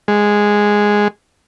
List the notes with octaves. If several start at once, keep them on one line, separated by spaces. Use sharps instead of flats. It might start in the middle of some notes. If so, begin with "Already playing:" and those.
G#3